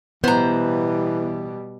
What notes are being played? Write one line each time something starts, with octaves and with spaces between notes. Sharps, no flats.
B2 E3 G3 B3 C5 A#5